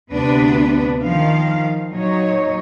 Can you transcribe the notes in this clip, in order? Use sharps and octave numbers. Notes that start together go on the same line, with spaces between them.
D2 C3 B3 D4 B4
D#3 F3 F5
A#2 F#3 D#4 C#5